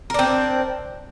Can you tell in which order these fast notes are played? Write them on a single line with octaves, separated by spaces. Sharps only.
A#4 D4 C4